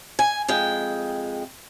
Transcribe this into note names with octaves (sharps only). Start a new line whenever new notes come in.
G#5
F2 G#3 G5